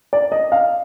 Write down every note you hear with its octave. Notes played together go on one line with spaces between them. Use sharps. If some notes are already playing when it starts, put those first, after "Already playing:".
D5
D#5
F5